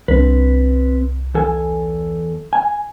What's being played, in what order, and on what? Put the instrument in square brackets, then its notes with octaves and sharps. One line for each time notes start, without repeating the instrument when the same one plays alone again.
[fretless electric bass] C2 D4 [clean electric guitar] C4 B4
[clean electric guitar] E2 A4 G#5
G#5